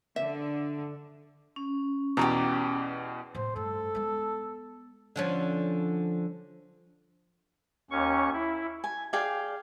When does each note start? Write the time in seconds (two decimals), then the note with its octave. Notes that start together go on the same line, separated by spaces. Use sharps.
0.16 D3 E5
1.56 C#4
2.17 E2 B2 G4 D5 A#5
3.35 A2 C3 C5
3.56 G2 A3 A4
3.95 G#3 B3
5.16 D3 F3 C#4
7.91 D#2 C#4 C#6
8.33 E4
8.84 G#5
9.13 G#4 D5 F5 G5